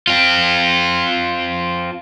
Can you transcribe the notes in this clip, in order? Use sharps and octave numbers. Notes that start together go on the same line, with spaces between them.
C4 F4